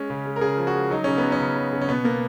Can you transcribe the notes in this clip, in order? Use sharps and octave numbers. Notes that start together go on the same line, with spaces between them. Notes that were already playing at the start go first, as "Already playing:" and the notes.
Already playing: G#3 C#4
C#3
G#3
A#4
C#3 G#4
F3
F#4
G#3
F#3 D#4
C#3 C#4
B3
F#3
C#4
C#3
F#3
C#3
C#4
B2 B3
B2 A#3